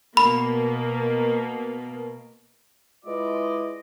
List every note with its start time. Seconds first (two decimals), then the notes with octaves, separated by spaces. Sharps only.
0.17 B2 A#3 B5
3.06 G#3 E4 F4 B4 D5 D#5